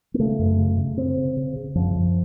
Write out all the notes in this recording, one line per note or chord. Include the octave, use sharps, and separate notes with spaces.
A#3
C#3 A3
F#2
C#3
C#3
C#3 C4
C#3
C#3
C#3
F#2 F3
F#2